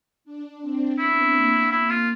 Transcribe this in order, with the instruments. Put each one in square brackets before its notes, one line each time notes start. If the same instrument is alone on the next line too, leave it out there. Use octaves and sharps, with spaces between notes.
[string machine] D4
C4
[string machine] B3 [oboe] E4
[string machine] A#3
[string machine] A#3 [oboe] E4
[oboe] F4